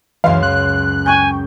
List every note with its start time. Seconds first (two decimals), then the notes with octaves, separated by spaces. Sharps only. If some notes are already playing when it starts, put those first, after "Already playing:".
0.24 C#2 F#2 E3 F5 C6
0.43 F#6
1.06 G5 G#5 C#6 G6